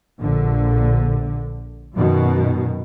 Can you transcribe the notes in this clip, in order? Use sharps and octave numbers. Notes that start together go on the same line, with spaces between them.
A#1 D3
F#2 B2 D#3